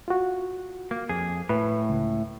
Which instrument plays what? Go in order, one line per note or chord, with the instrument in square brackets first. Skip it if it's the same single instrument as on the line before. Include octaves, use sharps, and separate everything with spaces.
[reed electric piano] F4 F#4
[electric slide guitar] A#3
F2 G#4
[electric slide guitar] A2 [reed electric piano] B4
[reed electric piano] C#2